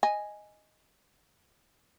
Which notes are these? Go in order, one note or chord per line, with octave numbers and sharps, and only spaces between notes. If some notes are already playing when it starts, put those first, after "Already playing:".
D#5 G#5